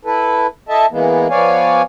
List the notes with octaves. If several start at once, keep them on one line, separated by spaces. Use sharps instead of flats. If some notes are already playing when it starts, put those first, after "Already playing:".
E4 A4 B4
E4 A4 D#5 E5 A5
E3 G#3 A#3 B3
F3 B3 C#5 D5 F5 G#5